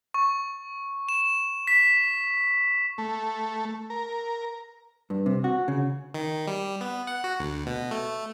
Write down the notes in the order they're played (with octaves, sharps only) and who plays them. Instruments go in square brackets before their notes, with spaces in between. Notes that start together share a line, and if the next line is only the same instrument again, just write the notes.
[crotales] C#6
E7
B6
[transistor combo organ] A3
A#4
[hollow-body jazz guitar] G2
C3
F#4
C#3
[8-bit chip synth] D#3
G3
B3
F#5
F#4
D2
B2
A3